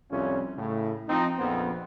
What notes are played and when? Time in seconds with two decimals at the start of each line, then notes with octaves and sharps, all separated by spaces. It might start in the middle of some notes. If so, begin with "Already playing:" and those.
0.11 C2 F2 C#4 F4
0.57 A2 C#3
1.09 F3 C4 D#4
1.38 A#1 F2 B3 C4